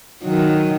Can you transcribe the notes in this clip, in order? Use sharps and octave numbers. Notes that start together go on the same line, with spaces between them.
D#3 F#3